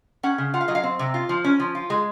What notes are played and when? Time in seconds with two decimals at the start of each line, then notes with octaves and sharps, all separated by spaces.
0.23 C#4 F#5
0.38 C#3
0.54 F4 F#5
0.61 F5
0.68 F#3 D#5
0.75 F5
0.83 C4
0.99 C3
1.14 F4
1.29 F3
1.44 C#4
1.60 F3
1.75 F4
1.90 G#3